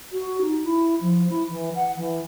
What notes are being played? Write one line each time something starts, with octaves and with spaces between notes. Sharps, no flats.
F#4
D#4
E4
F3
E4
E3
F#5
E3